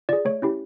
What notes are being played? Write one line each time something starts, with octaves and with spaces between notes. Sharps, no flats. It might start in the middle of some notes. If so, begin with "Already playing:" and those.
F4 G#4 D5
A3 C#5
C#4 E4 G4